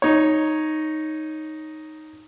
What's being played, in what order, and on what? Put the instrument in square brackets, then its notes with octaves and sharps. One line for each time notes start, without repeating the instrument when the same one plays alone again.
[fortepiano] D#4 C#5